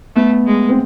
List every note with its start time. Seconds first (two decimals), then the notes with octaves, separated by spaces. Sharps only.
0.16 A3 B3
0.47 G#3
0.69 C4